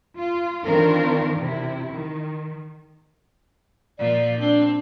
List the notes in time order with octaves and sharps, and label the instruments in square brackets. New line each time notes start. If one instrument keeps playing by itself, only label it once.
[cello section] F4
D#3 E3 C4 D4 F4 A#4
C3 E4
D#3
[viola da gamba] A#2 F3 F4 [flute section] D5
[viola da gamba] C4 [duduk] D4